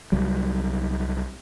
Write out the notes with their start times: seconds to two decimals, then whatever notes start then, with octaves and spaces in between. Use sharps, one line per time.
0.12 C2 F#3 G3